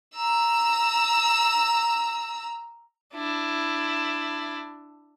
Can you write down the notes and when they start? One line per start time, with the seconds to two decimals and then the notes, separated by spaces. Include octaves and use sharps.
0.16 A#5 E6
3.14 D4 E4